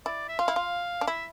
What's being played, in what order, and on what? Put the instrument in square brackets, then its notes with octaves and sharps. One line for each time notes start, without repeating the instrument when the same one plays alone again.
[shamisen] E4 [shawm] D5
[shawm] E5
[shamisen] F4 [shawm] F5
[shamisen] E4
F4
D4
[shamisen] E4 [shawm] E5